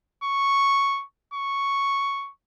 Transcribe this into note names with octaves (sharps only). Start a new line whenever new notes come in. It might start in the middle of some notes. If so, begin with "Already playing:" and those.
C#6
C#6